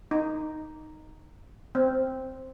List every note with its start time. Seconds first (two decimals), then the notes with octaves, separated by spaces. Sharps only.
0.11 D#4
1.75 C4